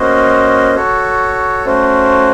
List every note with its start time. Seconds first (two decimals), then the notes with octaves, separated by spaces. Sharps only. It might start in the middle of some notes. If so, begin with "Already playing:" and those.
Already playing: A#3 C#4 F#4 C5 D#5
0.74 F#4 A4 C#5
1.65 A3 C#4 F#4 C5